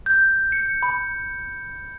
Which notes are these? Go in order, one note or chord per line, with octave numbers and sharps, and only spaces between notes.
G6
C#7
B5